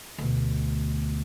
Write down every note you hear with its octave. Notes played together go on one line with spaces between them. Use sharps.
D2 B2